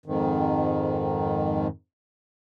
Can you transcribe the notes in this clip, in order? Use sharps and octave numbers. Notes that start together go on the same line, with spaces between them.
F2 G#2 D#3